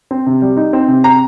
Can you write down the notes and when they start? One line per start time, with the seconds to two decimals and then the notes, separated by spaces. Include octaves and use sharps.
0.11 C4
0.26 C3
0.42 G3
0.57 D#4
0.73 C4
0.88 C3
1.04 C4 A#5